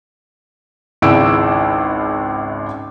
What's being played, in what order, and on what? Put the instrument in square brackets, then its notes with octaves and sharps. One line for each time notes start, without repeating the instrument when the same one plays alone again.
[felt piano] G#1 C#2 E4 E6 D7